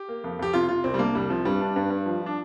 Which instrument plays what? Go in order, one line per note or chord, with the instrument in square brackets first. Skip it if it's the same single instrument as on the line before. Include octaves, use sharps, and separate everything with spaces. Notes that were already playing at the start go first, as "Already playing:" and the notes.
Already playing: [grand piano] G4
[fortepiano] A#3
F2
[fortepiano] F2 [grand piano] G4
[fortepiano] C3 [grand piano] F4
[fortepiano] C3 [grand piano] F4
[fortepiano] C2 [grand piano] C4
[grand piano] G3
[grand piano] A#3 [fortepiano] D4
[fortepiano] C2 [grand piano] G3
[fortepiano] C3 [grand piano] F3
[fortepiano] G2 [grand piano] G3
[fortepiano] D4
G2
G2
F3
[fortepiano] F3 [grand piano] D4